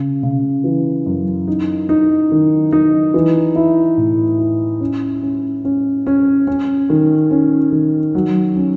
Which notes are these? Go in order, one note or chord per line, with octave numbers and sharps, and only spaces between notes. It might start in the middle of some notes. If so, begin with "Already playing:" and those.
Already playing: C#3
C#3
E3
F#2
D#4
D#4
D#3
D#4
E3
E4
A2
E4
C#4
C#4
C#4
C#4
C#4
D#3
C#4
D#3
F#3
C#4